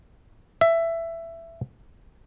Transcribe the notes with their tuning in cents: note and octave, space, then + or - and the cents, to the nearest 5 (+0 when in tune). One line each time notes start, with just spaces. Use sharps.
E5 +15